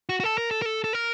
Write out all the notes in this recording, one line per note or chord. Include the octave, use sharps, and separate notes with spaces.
F#4
F#4
A4
A#4
A4
A#4
A4
A4
A#4